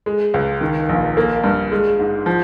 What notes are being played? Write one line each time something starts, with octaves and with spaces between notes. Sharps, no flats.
G#3
C#2
D#3
A#1
A#3
G2
G#3
G#2
F3